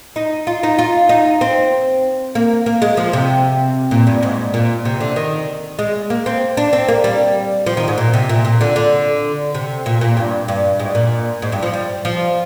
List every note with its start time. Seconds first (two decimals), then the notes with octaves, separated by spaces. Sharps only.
0.16 D#4
0.47 F4
0.63 D#4
0.78 F4
1.09 D#4
1.41 C4
2.35 A#3
2.66 A#3
2.82 G#3
2.97 F3
3.13 C3
3.91 A#2
4.07 G2
4.23 G#2
4.54 A#2
4.85 C3
5.00 D3
5.16 D#3
5.79 G#3
6.10 A#3
6.26 C4
6.57 D4
6.73 C4
6.88 A#3
7.04 G3
7.66 F3
7.77 D#3
7.88 G#2
7.98 A#2
8.13 C3
8.29 A#2
8.45 A#2
8.61 D3
8.76 D3
9.54 C3
9.86 A#2
10.01 A#2
10.17 G2
10.48 G2
10.80 G#2
10.95 A#2
11.42 G#2
11.52 G2
11.62 F3
11.74 G3
12.05 F3